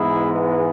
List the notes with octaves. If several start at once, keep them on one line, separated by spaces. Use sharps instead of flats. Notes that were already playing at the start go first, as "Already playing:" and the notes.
Already playing: G#2 E3 G#3 B3 E4 G#4